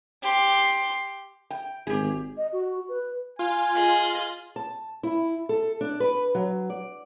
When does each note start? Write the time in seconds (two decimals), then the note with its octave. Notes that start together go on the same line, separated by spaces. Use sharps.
0.23 G4 C6
1.51 G5
1.87 G#1 G4 G#4
2.37 D#5
2.53 F#4
2.89 B4
3.39 F4 G#5
3.75 G#4 D#5
4.56 A5
5.03 E4
5.49 A4
5.81 D4
6.00 B4
6.35 F#3
6.70 D5